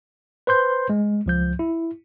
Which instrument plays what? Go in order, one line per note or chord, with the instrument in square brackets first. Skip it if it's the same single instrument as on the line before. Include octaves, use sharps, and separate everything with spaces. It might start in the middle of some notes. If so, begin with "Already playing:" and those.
[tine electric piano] B4 C5 C6 G6
G#3
C#2 F3 G6
E4